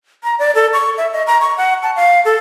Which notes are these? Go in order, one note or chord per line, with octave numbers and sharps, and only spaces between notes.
A#5
D5
A4
C#6
E5
D#5
A#5
C#6
F#5
A5
F5
A4